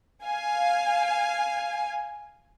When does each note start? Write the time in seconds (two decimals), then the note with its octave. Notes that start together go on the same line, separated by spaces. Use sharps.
0.23 F5 G#5